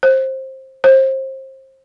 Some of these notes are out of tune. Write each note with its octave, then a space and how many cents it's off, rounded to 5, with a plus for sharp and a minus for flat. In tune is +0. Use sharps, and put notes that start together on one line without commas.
C5 +20
C5 +30